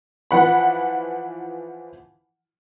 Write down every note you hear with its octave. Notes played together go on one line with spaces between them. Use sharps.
E3 F3 F#5 B5